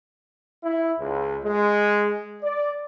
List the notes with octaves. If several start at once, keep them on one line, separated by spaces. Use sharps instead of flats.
E4
C#2
G#3
D5